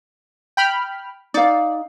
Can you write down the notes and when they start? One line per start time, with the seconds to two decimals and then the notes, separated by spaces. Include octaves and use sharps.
0.57 G5 B5 F6
1.34 D#4 D5 F5